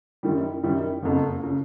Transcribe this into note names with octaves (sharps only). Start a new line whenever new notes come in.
F#2 D#3 G3
F#2 D#3 G3
F#1 F2 C#3
C#3